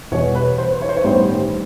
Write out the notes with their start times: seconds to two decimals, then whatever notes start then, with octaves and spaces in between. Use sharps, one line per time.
0.12 E2 B2 G3 C#5
0.35 B4
0.58 C5
0.82 C#5
0.89 C5
0.97 C#5
1.05 A1 G2 D#3 G3 B3 C5